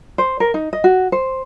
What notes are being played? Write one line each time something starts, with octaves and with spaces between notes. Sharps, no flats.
C5
A#4
D#4
D#5
F#4
C5